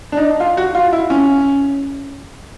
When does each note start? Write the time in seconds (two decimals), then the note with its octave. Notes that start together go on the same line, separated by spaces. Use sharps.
0.12 D4
0.17 D#4
0.40 F4
0.57 F#4
0.75 F4
0.93 E4
1.10 C#4